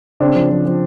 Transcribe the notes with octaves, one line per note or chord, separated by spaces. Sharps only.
C#3 C4 D4
F3
F3
F3